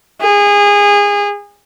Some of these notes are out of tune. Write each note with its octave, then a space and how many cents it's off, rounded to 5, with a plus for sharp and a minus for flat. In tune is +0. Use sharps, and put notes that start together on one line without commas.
G#4 -25